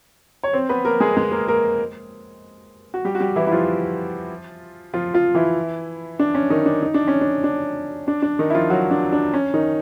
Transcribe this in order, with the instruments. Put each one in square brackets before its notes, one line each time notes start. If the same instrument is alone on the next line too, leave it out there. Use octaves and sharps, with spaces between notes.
[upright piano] C#5
C4 C5
B3 B4
A#3 A#4
G#3 G#4
G#3 G#4
A#3 A#4
A#3 A#4
F#4
G3 G4
F#4
G3 G4
E3 E4
E4
F3 F4
F3 F4
F3 F4
E3 E4
D4
C#4
D#3 D#4
D4
D#4
D4
C#4
D4
D4
D4
D4
D#3 D#4
E4
F3 F4
F#3 F#4
D4
D4
C#4
D#3 D#4